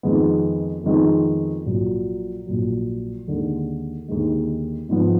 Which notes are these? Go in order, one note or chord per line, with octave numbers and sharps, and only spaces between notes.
F2 D#3 G#3 B3
F2 D#3 G#3 B3
A#1 A#2 F#3
A#1 A#2 F#3
D#2 D3 G#3
D#2 D3 G#3
G#1 G#2 F3 B3